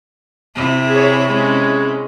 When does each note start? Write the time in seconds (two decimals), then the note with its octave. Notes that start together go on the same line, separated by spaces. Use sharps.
0.55 C3 E4
0.89 G#4 C#5
1.27 G#3 C#4